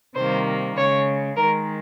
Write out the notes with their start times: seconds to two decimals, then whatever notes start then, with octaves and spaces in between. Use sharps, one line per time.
0.14 C3 D#3 G3 A#3 C5
0.75 C#3 G#3 C#5
1.35 D#3 G#3 A#4